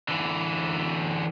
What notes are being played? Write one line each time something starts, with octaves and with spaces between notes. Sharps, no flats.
D3 E3